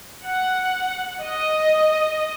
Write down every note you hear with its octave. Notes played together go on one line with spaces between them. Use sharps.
F#5
D#5